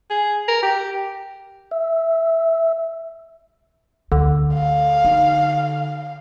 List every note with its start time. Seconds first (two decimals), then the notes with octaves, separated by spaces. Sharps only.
0.10 G#4
0.48 A#4
0.62 G4
1.71 E5
4.12 D2 D3
4.54 F5
5.05 D#4